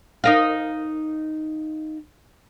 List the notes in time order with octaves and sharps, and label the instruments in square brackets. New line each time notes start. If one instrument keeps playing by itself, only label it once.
[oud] D#4 A#4 F5